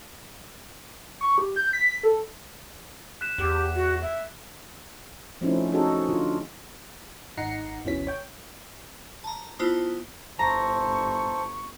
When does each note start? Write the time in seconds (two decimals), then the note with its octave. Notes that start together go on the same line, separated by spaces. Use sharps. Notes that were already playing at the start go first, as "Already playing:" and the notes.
1.21 C#6
1.38 G4
1.56 G6
1.73 B6
2.03 A4
3.21 F#6 B6 E7
3.38 E2 G4
3.75 F#4
4.02 E5
5.41 F3 A3 C4 C#4 D#4 E4
5.72 C#4 D#4 F#4 G#4 A4
6.09 D3 F4
7.37 G#1 D#4 F#5 A#5 C7 C#7
7.85 G1 D2 B2 E3 C#4 B6
8.07 C#5 G5
9.24 A5 A#5
9.59 B3 E4 F4 C5 A5 D#6
10.39 G1 E4 C5 A5 A#5 C#6